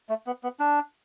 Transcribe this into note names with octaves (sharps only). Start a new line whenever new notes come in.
A3
B3
B3
D4